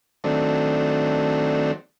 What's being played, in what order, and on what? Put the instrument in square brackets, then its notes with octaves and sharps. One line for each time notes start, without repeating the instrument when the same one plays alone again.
[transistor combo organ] D#3 F#3 A3 C4 D4